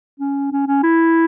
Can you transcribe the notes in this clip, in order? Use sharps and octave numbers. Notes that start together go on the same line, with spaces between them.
C#4
C#4
C#4
E4